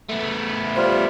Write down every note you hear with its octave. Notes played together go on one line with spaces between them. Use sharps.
A3 B3
G3 F4 C5